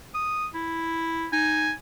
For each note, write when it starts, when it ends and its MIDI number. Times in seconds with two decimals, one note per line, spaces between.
0.14 0.47 87
0.54 1.27 64
1.32 1.72 63
1.32 1.73 80